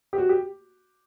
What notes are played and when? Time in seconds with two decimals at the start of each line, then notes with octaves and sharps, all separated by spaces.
0.13 G4
0.18 F#4
0.29 G4